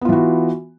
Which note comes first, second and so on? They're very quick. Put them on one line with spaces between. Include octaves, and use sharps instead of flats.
B3 F4 E3 F#4